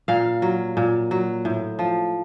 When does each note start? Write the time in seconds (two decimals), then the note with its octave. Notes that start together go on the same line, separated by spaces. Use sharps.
0.08 A#2 F5
0.42 F#3
0.77 A#2
1.11 F#3
1.45 A2
1.79 F3